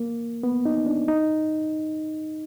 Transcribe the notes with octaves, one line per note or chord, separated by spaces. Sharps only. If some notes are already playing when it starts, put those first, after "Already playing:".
Already playing: A#3
B3
D#4
D4
D#4